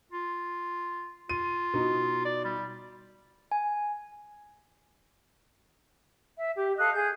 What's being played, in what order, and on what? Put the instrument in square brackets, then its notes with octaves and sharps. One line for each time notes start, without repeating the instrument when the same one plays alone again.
[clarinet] F4
[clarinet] F4 [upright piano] D#7
[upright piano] B2 D#4
[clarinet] D5
G3
[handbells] G#5
[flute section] E5
G4
A4 D#5 F5 F#6
G#4 G6